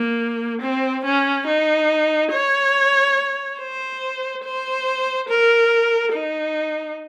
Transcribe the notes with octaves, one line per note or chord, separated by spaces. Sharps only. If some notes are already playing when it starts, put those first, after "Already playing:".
Already playing: A#3
C4
C#4
D#4
C#5
C5
C5
A#4
D#4